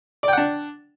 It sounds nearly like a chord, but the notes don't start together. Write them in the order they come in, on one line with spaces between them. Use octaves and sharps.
D5 G5 F#5 D4